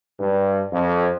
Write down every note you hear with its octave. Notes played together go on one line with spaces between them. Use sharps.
G2
F2